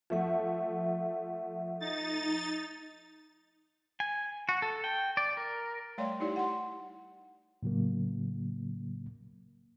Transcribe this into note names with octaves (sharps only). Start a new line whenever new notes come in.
F3 A3 E5 F#5
D#4 A6
G#5
F#4
A4
G5
D5
A#4
G3 A3 C#5 D5 G5 C6
D#4 E4 G4 D5
F#5 C6
A2 C#3 F#3 A#3